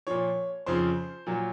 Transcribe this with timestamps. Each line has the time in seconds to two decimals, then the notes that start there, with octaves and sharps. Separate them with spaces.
0.07 A#2 F3 C#5
0.66 F2 C#3 F3 C5
1.27 A#2 F#3